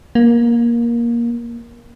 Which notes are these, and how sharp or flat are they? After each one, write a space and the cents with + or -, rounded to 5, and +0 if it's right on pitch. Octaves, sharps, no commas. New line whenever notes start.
A#3 +15